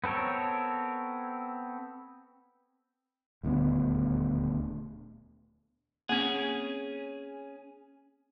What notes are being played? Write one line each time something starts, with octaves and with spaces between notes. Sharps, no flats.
B3 C4 A4 A#4 C#5
D#1 D2 G3 B3
A#3 C4 C#4 G#4